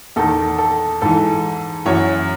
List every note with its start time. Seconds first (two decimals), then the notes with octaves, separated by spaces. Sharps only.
0.16 E2 D#3 A4
0.58 A4
1.01 G#2 E3 A4
1.86 F#2 E3 C#5